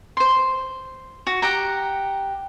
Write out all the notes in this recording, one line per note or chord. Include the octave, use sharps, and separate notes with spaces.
C5 C6
F#4
G4 F#5 A#5